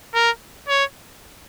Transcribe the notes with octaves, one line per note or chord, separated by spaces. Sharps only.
A#4
C#5